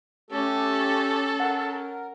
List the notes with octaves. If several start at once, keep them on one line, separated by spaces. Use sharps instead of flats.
A3 C#4 G4 A4
A#4 F#5